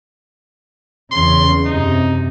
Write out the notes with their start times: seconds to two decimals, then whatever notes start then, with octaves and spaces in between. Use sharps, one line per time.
1.12 E2 C#3 C6
1.65 F#2 C3 D#4